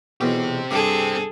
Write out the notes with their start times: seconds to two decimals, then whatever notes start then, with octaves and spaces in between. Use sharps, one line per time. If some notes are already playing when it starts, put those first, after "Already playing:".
0.21 B1 E2 B2 C4 G4
0.71 G2 C3 G#4 A4